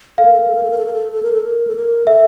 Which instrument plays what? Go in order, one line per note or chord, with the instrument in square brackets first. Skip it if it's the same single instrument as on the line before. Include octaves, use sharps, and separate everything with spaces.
[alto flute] A4 [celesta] F5
[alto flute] A#4
A4
A#4
A4
A#4
A4
A#4
A4
A#4
A4
A4
A#4
A4
A#4
A4
A#4
[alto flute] A4 [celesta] E5